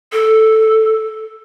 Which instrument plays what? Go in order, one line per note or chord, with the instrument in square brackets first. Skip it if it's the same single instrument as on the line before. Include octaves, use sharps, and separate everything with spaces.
[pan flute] A4